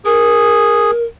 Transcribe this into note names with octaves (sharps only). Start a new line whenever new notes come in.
G#4 A#4